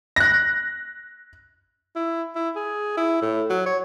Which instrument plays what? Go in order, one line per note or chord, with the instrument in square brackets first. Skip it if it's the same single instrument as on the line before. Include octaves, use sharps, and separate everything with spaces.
[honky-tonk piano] F#6 A#6
[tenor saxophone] E4
E4
G#4
E4
A2
F#3
C#5